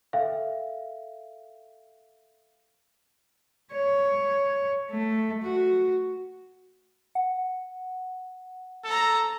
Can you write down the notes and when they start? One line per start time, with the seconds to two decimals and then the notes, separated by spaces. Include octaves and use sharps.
0.13 A4 E5 F5 G5
3.73 C#5
4.91 A3
5.43 F#4
7.15 F#5
8.85 A4 A5 A#5